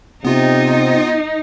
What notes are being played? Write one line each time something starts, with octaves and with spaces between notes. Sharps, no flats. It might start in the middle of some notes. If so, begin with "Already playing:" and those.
C3 B3 D#4 F4